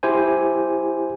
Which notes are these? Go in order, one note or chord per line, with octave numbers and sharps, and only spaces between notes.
E4 G4 C5 G#5